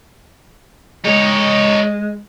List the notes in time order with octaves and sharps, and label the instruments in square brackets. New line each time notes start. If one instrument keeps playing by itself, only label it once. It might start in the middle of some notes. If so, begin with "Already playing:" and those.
[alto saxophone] G#3 [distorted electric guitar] D#4 C#5